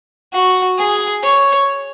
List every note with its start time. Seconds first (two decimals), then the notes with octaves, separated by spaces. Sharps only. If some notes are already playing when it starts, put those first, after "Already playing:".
0.33 F#4
0.78 G#4
1.23 C#5